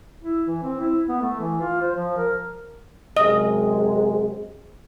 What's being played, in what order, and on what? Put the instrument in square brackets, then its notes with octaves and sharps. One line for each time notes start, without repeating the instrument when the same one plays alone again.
[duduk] E4
E3
C4
E4
B3
A3
E3
F4
C5
F3
A#4
[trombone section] F#2 C3 G#3 [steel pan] D#5